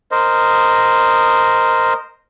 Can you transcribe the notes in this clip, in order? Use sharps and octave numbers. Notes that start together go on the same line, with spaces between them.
A#4 C5 D#5